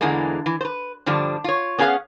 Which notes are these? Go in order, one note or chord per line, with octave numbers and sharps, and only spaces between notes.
E2 D3 E3 G#3 A#3
E3
B4 C5
G2 D3 F3 G3 D4
F4 C#5
B3 C#4 G#4 A#4 F5 F#5